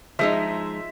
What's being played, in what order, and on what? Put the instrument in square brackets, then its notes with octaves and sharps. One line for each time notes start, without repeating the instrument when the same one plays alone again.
[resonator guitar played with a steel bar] F3 G#3 D#4 [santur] E5